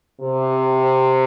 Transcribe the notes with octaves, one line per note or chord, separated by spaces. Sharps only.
C3